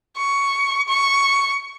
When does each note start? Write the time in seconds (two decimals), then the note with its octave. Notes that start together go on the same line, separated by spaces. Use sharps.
0.17 C#6
0.88 C#6